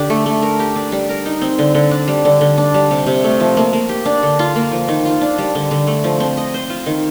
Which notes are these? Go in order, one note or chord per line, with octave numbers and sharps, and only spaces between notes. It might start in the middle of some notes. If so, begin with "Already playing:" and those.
Already playing: D3 D4 G4
A3
A3
A#4
G4
D4
G3
A#4
D#4
C4
D3
D3
D4
G3
D3
D3
D4
G3
C3
C3
A3
F3
A#3
A#3
G4
D4
D3
F4
A#3
F3
D#3
F4
D4
G3
D3
D3
A3
F3
C4
D#5
C5
F4
D#3